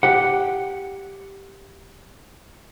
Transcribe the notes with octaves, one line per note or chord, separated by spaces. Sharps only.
G4 F#5